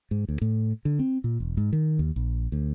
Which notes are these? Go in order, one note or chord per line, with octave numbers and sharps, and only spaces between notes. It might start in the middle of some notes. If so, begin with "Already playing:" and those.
G#2
D2
A2
D3
C4
A#2
E1
G#2
D#3
D#2
A#1
D2